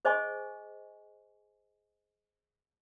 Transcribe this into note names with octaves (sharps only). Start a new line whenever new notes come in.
G#4 C5 D#5 G#5 C#6